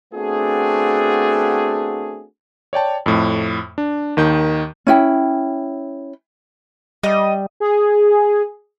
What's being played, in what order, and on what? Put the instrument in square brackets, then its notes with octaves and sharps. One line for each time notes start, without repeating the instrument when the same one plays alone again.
[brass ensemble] A3 B3 C4 D4 F#4 G#4
[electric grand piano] C#5 D5 G5 A5
F2 A2
D4
D#2 D#3 G6
[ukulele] C#4 E4 G5
[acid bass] G3 [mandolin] D#5
[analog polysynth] G#4